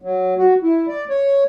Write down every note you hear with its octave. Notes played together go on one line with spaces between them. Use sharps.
F#3
F#4
E4
D5
C#5